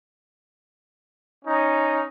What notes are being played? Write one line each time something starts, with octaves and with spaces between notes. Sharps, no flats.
C#4 D#4